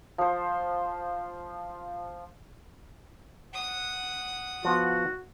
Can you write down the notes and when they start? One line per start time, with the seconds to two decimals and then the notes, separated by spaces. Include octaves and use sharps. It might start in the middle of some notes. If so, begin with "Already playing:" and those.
0.18 F3 C5
3.54 F#5 D#6
4.65 F3 B3 F4 F#4